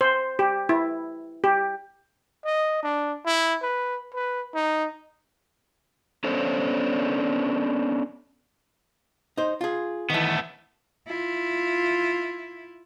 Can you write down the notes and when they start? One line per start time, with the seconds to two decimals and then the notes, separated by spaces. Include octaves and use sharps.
0.01 C5
0.39 G4
0.69 E4
1.44 G4
2.45 D#5
2.83 D4
3.25 E4
3.62 B4
4.14 B4
4.55 D#4
6.24 B3 C#4 D4 A4 C5 C#5
9.38 D#4 C5
9.61 F4 G#4
10.10 D#3 E3 A3 B3
11.07 E4 F4